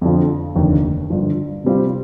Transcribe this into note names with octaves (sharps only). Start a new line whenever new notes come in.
F2 D3 F3
F1 D#2 D3
G1 G2 F3
C3 G3 C4 F4